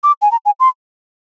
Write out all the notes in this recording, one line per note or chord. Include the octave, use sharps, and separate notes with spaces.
D6
G#5
A#5
G#5
C6